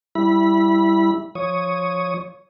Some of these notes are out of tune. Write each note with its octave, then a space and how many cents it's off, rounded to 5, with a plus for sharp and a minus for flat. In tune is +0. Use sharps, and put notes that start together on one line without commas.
G3 +0 E4 +0 B5 -20
F3 +0 C#5 +0 D#6 +0